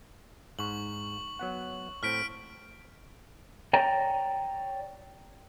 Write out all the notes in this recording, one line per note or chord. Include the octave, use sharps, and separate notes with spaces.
G#2 C#6 F#7
F#3 B3 F#5
A2 C4 F6 B6 D7
C#5 D5 G5 A#5